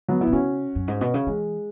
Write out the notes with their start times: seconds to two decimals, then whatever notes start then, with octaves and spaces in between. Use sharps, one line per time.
0.08 F#3 B3
0.21 B3 E4
0.27 B2
0.32 C#3 C#4 F#4
0.75 F#2
0.88 G#2
1.01 B2
1.14 C#3
1.27 E3 G#3